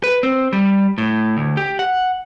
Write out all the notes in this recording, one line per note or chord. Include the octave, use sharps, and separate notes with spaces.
B4
C4
G3
A2
D2
G4
F#5